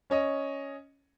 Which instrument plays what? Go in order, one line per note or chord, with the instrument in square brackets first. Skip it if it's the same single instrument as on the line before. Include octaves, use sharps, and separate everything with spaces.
[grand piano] C#4 C#5 D#5